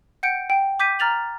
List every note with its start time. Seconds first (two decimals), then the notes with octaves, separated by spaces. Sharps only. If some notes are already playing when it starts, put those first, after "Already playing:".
0.23 F#5 G5 G6 C#7 D7
0.50 G5
0.80 D6 G6 B6 D#7
0.99 A#5 F6 A6 F7 F#7